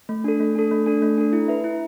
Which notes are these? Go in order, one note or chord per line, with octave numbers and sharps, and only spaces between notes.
A3
D4 A4
A3
D4 A4
A3
D4 A4
A3
D4 A4
E4
B4 E5
E4